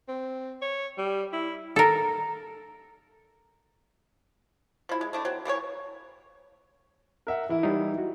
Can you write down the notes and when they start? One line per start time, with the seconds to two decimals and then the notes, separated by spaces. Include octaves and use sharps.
0.08 C4
0.61 C#5
0.98 G3
1.32 E4
1.76 A4 A#4
4.89 F3 E4
5.01 G#3
5.13 A3 D4 E4
5.25 F#3 C4
5.45 E3 A#3 G#4 C#5
7.27 A#4 E5 F#5
7.49 E3 E4
7.63 G3 D#4
7.98 F#4